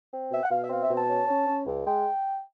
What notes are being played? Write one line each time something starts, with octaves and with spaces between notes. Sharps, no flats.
C4
B2 E5
F#5
B2 F5
E5
C4 F5
E5
B2
A5
C#4
C#4
C#4
C#2
G#3 G5